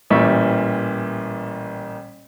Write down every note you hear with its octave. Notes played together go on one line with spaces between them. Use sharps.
A1 A#2 E3 G3 E5 C#6